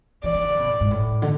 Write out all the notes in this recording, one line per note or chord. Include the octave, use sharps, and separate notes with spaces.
E3 D5
E3
D3
B2
A2
G#2
A2
D3